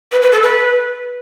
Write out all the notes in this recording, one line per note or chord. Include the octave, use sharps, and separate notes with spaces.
B4
B4
A4
B4